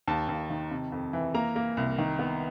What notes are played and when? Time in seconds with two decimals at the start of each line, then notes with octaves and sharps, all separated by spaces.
0.07 D#2 A5
0.29 D#2
0.50 D#3
0.71 C3
0.92 F2
1.13 E3
1.34 A#3 A#5
1.56 A#3
1.77 C2
1.98 D#3
2.19 B3